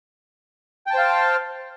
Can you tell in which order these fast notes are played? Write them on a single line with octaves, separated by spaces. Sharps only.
G5 A5 C5 F5